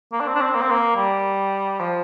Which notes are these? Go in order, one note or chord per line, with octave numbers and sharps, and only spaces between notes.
A#3
D4
C4
D4
C4
A#3
C4
A#3
G3
F3